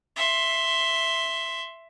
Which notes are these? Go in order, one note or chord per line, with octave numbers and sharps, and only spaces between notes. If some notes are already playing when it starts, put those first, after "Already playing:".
E5 C6